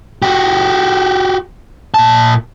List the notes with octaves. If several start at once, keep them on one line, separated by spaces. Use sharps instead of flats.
F#4 G4
A#2 A5